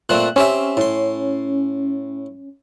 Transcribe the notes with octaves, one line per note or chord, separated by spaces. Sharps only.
A#2 A3 C4 F#6
C4 C#4 G4 E5
A2 C6